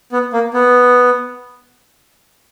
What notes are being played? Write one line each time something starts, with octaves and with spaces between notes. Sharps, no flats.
B3
A#3
B3